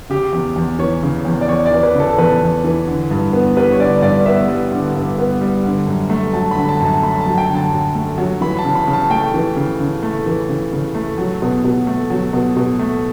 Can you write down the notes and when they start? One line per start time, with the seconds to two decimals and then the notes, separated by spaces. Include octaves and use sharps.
0.09 C#3 G4
0.33 E2
0.56 E2
0.79 E3 C#5
1.03 C#3
1.25 E2
1.41 D5
1.48 E2 C#5
1.66 D5
1.71 E3
1.83 B4
1.94 C#3
2.00 A4
2.18 E2 B4
2.41 E2
2.64 E3
2.88 D3
3.11 G2
3.33 B3
3.57 G3 B4
3.72 C#5
3.79 D3 D5
4.02 G2 D5
4.26 B3 E5
4.48 G3
4.72 D3
4.95 G2
5.18 B3
5.41 G3
5.64 D3
5.87 F#2
6.10 A3
6.33 F#3 A5
6.51 B5
6.56 D3
6.69 A5
6.80 F#2 A5
7.02 A3 B5
7.21 A5
7.26 F#3
7.38 G5
7.49 D3
7.55 A5
7.71 F#2
7.95 A3
8.18 F#3
8.41 E3 B5
8.59 A5
8.65 C#3
8.75 B5
8.87 C#3
8.93 A5
9.10 A3 G5
9.34 E3
9.56 C#3
9.80 C#3
10.03 A3
10.26 E3
10.49 C#3
10.73 C#3
10.95 A3
11.18 F#3
11.42 B2
11.65 B2
11.87 A3
12.10 F#3
12.33 B2
12.57 B2
12.79 A3